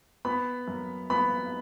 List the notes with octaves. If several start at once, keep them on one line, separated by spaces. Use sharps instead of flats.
B3 B5
F#2
B3 B5